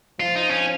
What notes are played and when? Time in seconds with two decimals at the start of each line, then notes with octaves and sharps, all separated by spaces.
0.20 F3 F4
0.36 D#4
0.50 C#4